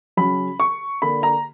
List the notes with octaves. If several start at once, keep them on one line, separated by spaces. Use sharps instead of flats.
C#3 F#3 C#4 B5
C#6
D3 A#3 D4 B5
A#5